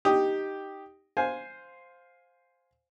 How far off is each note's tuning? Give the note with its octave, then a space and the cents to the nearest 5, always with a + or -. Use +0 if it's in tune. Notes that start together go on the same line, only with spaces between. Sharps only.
D#4 +0 G4 +0 D#6 +0
C5 +0 F5 +15 G#5 +0